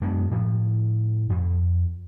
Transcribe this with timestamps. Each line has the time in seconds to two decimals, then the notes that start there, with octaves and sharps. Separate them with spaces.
0.01 F#2 G#3 B3 D4
0.31 A2 F3
1.30 F2